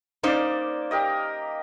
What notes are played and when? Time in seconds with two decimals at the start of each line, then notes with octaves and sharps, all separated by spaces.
0.23 A#3 C#4 D#4 C5 D5
0.91 G4 A#4 D#5